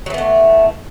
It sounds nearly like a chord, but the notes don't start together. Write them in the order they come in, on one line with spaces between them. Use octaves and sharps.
F#3 E3 B3 A3